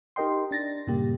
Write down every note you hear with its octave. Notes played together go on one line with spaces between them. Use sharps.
D#4 G4 A#4 D#5 G5 C6
D4 A6 A#6
G2 A#2 C#3 G3 A#3 G4